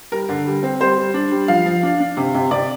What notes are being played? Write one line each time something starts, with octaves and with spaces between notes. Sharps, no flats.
G3 A#4
D3
G3
C4
G3 C5
G3
D4
G3
F3 F5
F3
D4
D4
C3
C3
C3 D5